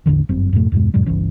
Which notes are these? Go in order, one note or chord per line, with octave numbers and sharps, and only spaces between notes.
A1 E2 D3 E3
G1 F#2 C4
F2 G#2 B2 A3
E2 G2 B2 G#3
F2 A2 C3 G3
G1 C#2 E3 C#4